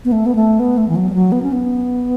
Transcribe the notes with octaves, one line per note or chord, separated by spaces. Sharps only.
B3
A3
B3
A3
B3
A3
E3
F#3
G3
F#3
B3
C#4
B3